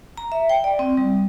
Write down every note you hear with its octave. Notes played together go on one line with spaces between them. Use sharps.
A#5
E5
G5
D5
C4
G3